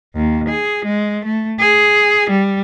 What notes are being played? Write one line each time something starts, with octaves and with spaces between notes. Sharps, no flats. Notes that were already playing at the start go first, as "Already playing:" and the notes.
D#2
G#4
G#3
A3
G#4
G3